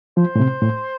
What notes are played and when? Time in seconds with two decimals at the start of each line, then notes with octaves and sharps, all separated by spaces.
0.17 F3 C5
0.36 A2
0.40 C3
0.61 A2